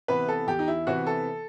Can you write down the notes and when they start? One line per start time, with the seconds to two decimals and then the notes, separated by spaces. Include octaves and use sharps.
0.08 C3 E3 B3 B4
0.28 A4
0.47 E2 G4
0.59 D#4
0.68 E4
0.87 C3 E3 B3 F#4
1.07 A4